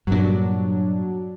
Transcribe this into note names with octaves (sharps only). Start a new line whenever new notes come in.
G2 A#2 F#3 D4